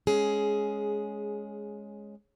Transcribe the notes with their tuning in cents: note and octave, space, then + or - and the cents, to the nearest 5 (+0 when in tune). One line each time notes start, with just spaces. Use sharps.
G#3 +0 C#4 +0 G#4 +10